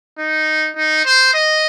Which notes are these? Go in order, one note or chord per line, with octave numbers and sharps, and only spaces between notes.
D#4
D#4
C5
D#5